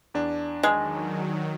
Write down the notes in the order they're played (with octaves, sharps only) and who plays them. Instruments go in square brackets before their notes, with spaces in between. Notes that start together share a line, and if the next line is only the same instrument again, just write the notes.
[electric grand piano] E2 D4
[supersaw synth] D#3 F#3 [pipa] G#3